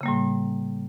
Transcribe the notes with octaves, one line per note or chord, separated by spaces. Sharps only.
A2 C#3 G3 A#3